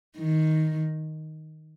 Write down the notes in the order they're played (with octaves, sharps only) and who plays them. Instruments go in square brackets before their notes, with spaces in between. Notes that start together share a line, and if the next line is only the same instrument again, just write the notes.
[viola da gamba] D#3